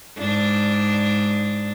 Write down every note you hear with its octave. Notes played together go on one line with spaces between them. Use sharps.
G#2 D4